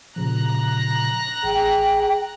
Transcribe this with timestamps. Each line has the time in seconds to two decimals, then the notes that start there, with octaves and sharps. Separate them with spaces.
0.16 A#2 C#3 F3 A#5 F#6 A#6
1.44 A1 G#4 G5